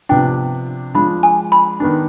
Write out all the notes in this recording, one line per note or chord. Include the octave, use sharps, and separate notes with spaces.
C3 F3 B3 D4 G5
F3 G#3 D4 B5
G#5
B5
D#3 B3 D4